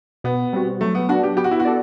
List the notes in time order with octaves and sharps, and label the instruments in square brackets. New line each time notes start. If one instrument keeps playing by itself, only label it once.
[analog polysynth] B2 [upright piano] B3
[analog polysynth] G3 C4 F#4
[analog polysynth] F#3 [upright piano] A3
[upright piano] B3
[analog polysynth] B3 D4 [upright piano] F#4
[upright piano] G4
[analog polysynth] B3 [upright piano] G4
[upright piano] F#4
E4
F#4
[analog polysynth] A4 D5